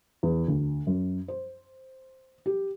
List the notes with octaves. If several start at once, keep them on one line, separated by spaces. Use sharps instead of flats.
E2
D2
F#2
C5
G4